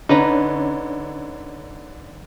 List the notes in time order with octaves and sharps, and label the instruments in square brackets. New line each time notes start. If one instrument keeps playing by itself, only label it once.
[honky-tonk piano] D3 C#4 [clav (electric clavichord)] D#4 B4 A#5